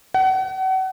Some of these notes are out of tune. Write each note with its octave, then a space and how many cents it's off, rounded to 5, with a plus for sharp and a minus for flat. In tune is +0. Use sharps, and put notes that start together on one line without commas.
F#5 +35